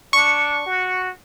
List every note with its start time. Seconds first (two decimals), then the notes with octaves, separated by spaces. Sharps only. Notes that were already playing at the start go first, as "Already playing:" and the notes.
0.13 D4 C#6
0.66 F#4